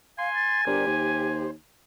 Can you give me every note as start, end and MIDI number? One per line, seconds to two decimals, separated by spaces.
0.18 0.32 77
0.18 1.49 80
0.18 0.61 84
0.34 0.65 93
0.67 0.85 31
0.67 0.86 62
0.67 1.47 67
0.67 0.86 70
0.67 0.86 72
0.87 1.51 39
0.87 1.51 72